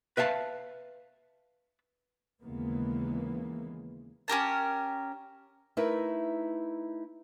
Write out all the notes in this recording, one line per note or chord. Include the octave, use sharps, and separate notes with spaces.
B4 E5 F5 A5
D#2 C#3 E3 G#3 A#3 B3
C#4 G4 A#4 A5
A3 D#4 E4 A#4 B4 E5